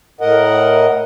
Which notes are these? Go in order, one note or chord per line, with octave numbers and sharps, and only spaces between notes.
A2 A#4 D#5 F#5